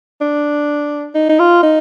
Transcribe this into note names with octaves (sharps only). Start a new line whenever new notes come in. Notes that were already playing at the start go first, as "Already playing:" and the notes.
D4
D#4
D#4
F4
D#4